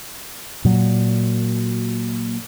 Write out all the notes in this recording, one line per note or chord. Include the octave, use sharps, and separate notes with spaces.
A#2 F#3